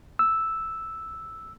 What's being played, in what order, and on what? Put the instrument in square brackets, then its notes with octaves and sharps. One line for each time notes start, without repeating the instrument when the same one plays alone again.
[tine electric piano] E6